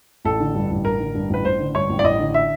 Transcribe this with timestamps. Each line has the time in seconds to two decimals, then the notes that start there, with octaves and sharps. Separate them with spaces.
0.25 A1 A4
0.40 D3
0.55 G2
0.71 A1
0.85 A1 A#4
1.00 D3
1.15 G2
1.30 A1 B4
1.44 A1 C5
1.59 D3
1.74 G2 C#5
1.90 A1
1.99 D5
2.04 A1 D#5
2.19 D3
2.34 E5